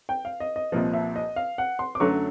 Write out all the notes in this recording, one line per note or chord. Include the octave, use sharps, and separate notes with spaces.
G5
F5
D#5
D#5
C2 A#2 F3 D#5
E5
D#5
F5
F#5
C6
D6
F#2 D3 F#3 A3 C#6